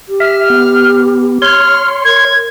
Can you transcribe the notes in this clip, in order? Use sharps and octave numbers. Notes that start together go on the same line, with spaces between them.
G4
E5 F6
B3
C#5 C6 F6
A#4 G#6